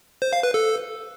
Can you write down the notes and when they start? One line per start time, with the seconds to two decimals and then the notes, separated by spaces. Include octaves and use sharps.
0.22 C5
0.33 F5
0.43 B4
0.54 A4